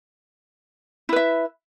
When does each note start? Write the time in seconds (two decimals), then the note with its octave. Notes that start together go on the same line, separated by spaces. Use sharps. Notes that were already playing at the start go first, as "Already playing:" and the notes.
1.09 E4
1.13 B4
1.16 E5